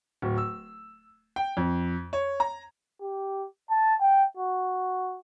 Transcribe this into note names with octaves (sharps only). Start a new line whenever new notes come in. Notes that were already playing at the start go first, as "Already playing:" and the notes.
D1
E6
G5
F2
C#5
A#5
G4
A5
G5
F#4